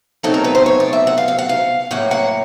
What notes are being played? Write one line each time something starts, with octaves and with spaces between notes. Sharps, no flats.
B2 F#3 A3 C4 D#4 A4
A#4
B4
C5
C#5
D5
E5
F#5
F5
F5
F#5
F5
A2 F#3 A#3 F#5
F#5